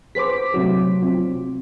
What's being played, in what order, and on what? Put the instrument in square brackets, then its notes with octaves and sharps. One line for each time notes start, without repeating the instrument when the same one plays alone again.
[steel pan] G#4 B4 C5 [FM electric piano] D6 B6
[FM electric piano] C3 F#3 [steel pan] A3 C#4 E4
[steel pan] C4 F4